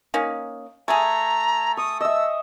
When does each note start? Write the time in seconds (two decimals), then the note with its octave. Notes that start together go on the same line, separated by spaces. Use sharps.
0.14 A#3 C#4 D#4
0.88 A3 G#4 G#5 A#5
1.77 C#6 D#6
2.01 D#5 E5 E6